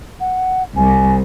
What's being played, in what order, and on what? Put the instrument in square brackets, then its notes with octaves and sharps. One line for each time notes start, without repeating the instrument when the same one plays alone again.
[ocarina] F#5
[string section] C2 [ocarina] G#5